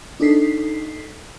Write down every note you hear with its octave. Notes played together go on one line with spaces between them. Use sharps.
D4 D#4 A4 B6 C7